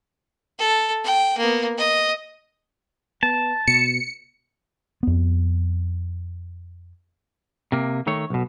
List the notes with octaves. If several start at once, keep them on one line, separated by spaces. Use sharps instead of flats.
A4
G5
A#3 B3
D#5
B3 A5
B2 C#7
F2 B3
C3 A#3
D#3 A3 C#5
B1 B2